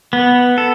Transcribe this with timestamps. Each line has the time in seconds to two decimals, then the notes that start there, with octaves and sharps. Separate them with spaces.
0.13 B3
0.58 A4